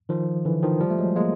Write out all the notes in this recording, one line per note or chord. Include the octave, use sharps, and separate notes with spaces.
D#3 F3
D3 E3
D#3 F3
F3 G3
A3
F#3 G#3
G#3 A#3